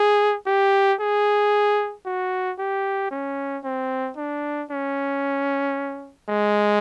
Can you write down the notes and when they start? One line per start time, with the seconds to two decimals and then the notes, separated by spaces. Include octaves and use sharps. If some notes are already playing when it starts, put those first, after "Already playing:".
Already playing: G#4
0.46 G4
1.00 G#4
2.05 F#4
2.59 G4
3.11 C#4
3.64 C4
4.17 D4
4.71 C#4
6.29 G#3